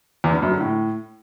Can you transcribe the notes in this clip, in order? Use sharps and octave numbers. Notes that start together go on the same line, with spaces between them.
E2
G2
F#2
D3
A2